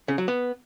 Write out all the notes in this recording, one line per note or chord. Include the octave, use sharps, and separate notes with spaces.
C#3
F#3
B3